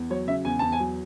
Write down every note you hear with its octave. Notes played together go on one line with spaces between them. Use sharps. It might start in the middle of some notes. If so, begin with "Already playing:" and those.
Already playing: E2
F#3 C#5
C#3 E5
E2 G#5
E2 A5
G#5
F#3